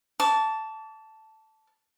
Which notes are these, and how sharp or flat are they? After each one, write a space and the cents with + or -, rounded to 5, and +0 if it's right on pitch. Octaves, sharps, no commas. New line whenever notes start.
A5 +0 D6 -40